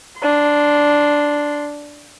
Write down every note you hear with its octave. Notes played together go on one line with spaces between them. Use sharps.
D4 C6